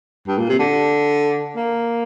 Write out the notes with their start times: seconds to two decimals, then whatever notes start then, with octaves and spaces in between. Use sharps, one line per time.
0.28 G2
0.38 A#2
0.49 C3
0.59 D3
1.56 A#3